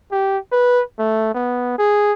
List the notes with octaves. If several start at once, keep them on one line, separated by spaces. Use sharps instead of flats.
G4
B4
A3
B3
G#4